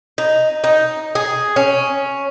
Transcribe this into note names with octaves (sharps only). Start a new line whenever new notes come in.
D#4
D#4
G#4
C#4